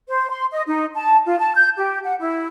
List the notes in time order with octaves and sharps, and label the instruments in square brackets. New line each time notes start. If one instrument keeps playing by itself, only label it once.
[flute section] C5
C6
D#5
D#4
A5
F4
A5
G6
G4
F#5
E4